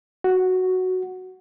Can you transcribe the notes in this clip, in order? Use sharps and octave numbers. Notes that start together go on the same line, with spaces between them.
F#4